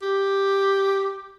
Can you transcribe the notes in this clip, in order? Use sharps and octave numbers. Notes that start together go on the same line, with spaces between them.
G4